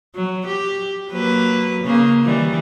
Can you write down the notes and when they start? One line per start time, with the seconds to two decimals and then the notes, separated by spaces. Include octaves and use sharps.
0.15 F#3
0.46 G4
1.10 F#3 A#3 B4
1.84 C#3 A#3
2.24 D#3 E3 G3